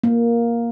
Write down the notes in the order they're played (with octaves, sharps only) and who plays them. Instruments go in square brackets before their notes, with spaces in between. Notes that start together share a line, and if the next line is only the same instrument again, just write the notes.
[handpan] A#3